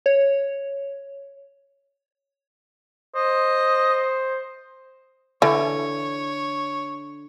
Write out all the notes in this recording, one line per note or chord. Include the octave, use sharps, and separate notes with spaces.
C#5
C5 D#5
D3 E3 C#5